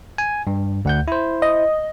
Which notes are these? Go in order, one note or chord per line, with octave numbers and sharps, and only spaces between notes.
G#5
G2
D2 F#5 G6
E4 C5
D#5